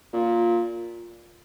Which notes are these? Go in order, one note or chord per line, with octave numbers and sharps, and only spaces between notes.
A#2